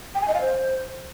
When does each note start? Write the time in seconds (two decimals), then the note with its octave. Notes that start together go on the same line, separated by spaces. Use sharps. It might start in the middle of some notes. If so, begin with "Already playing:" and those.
0.15 G5
0.21 G#5
0.28 D#5
0.34 F5
0.41 C5